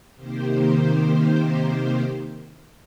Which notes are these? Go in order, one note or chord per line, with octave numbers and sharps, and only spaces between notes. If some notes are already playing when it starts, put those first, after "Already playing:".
C3 D#3 A#3 G4 C5